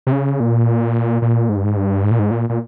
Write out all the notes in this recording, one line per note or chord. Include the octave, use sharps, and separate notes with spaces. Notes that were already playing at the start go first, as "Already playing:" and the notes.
C3
C#3
A#2
A#2
G#2
G2
G#2
G2
G#2
A#2
G#2
A#2
A#2